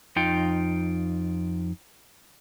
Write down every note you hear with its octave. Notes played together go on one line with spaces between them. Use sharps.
F2 D#4 F4 G5